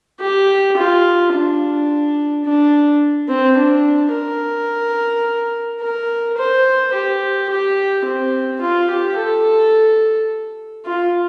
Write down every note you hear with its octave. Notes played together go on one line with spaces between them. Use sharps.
G4
F4
D4
D4
C4
D4
A#4
A#4
C5
G4
G4
C4
F4
G4
A4
F4